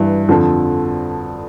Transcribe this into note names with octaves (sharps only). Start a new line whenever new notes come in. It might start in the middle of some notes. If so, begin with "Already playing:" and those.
Already playing: G2 E3
F2 D3 F3 A4